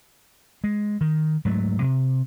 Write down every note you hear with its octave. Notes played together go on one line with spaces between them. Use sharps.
G#3
D#3
G#2 F#3 A3
C3